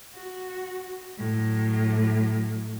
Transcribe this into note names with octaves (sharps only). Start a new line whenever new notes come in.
F#4
A2 F#3